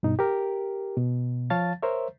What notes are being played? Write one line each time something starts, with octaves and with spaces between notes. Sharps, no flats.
G2 B2 D#4
G4 A#4
B2
F3 C#5 F5 A5 A6
A#4 C5 C#5 E5